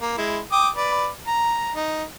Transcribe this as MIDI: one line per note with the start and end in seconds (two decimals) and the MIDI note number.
0.01 0.14 58
0.17 0.39 56
0.17 0.39 64
0.52 0.68 79
0.52 0.68 86
0.52 0.68 87
0.76 1.08 71
0.76 1.08 74
1.27 1.73 82
1.75 2.04 63